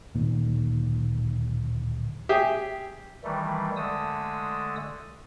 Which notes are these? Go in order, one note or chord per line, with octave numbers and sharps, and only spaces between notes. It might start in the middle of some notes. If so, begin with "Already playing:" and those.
D1 A#2 D#3 A#3
G4 G#4 E5
D#3 E3 G3 A3
D3 G#3 A3 D#6 E6